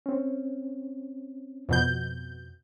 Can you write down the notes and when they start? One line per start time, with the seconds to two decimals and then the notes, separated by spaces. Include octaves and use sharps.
0.06 C4 C#4
1.69 F2 B2 G6